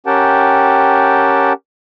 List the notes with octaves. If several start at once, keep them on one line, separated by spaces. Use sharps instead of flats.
C#4 G4 A#4 F#5 G5 A5